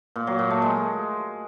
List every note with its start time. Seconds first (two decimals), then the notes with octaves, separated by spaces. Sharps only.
0.16 A#2
0.27 F#3
0.39 A#2
0.50 A3
0.62 G#3